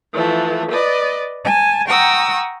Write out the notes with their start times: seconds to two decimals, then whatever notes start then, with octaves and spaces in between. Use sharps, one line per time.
0.13 E3 F3 A3
0.70 B4 D5 D#5
1.44 G#5 A5
1.87 F#5 G5 A#5 C#6 D#6 E6